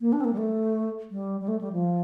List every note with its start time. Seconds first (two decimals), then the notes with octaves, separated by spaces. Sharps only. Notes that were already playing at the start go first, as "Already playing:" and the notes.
0.01 A#3
0.13 D4
0.21 C4
0.25 A#3
0.33 G3
0.38 A3
1.11 G3
1.41 G3
1.48 A3
1.61 G3
1.73 F3